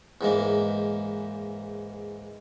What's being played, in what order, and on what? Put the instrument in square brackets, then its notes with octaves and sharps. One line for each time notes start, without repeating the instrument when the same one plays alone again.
[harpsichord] E2 G#2 A#3